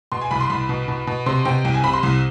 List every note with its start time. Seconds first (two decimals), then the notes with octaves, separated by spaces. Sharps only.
0.12 B2 C6
0.21 G#5
0.31 C2 B5
0.41 C6
0.50 C2 B5
0.69 B2
0.88 B2
1.07 B2
1.26 C3 C6
1.45 C3 G5
1.64 C2 G5
1.74 G#5
1.83 C3 B5
1.93 C6
2.03 C2